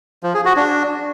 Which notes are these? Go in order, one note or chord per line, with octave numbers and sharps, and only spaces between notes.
F3
G#4
F#4
D4